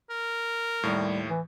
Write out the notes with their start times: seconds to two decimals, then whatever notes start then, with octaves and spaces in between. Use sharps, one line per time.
0.10 A#4
0.83 D#2 A2 G3
1.28 E3